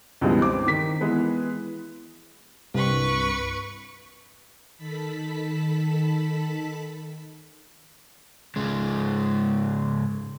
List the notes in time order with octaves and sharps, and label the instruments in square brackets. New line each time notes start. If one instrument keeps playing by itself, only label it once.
[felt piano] C#2 G2 B2 E3 F3 G#3
C4 D6
D#3 B6
E3 G#3 B3
[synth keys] C2 G2 [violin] B4 C#6
[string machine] D#3 A4 A5 B5 B6
[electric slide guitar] G#2 C#3 G#3